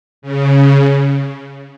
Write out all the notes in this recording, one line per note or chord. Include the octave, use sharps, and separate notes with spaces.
C#3